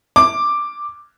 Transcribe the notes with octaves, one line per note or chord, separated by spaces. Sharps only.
D6